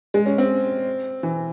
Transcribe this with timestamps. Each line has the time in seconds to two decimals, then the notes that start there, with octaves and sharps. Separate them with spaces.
0.14 G#3
0.26 C#4
0.38 C4
1.23 E3